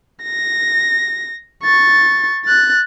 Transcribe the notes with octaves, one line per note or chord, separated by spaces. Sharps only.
A#6
C#6 A6
F#6 A6